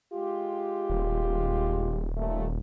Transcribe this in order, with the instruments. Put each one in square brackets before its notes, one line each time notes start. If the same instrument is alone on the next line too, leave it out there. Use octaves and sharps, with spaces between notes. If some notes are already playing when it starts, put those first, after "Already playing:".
[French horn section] G#3 F4 G4
[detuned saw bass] D#1
[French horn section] D#2 A#2 A3